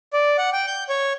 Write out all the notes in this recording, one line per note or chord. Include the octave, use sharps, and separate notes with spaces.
D5
F#5
G5
G6
C#5